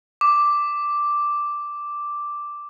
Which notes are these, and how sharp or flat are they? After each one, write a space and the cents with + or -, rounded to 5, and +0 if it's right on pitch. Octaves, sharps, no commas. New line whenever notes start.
D6 +0